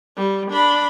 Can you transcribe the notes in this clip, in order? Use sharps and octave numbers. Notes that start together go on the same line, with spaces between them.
G3
D4 B5